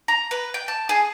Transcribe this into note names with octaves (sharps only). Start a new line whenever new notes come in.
A#5
B4
G5
A5
G#4